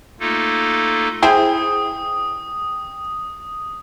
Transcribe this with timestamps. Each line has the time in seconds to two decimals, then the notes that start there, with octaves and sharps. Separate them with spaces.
0.20 A3 A#3 D#4 F4 A4
1.23 E4 G#4 C5 G5 D#6